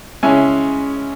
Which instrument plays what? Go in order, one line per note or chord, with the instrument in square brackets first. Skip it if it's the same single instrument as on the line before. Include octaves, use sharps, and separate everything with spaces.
[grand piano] C#3 G#3 C#4 E4 E5 G#5